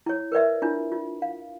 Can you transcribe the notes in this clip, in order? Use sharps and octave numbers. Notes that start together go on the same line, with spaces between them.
E4 C#5
A#4 B4 D5 E5
D4 E4 F4
F4
F5